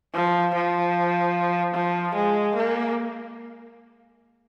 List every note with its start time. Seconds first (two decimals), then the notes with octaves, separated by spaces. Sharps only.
0.14 F3
0.55 F3
1.74 F3
2.15 G#3
2.55 A#3